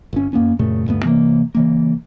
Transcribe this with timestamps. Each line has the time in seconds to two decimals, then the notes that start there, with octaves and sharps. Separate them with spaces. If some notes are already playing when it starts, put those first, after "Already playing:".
0.13 G1 C#4
0.33 F#2 A#3 B3 C#4
0.59 F#2 A#2 C#3 A3
0.88 D2 G2 A3 B3
1.03 C3 E3 A3 A#3
1.55 C#3 E3 A#3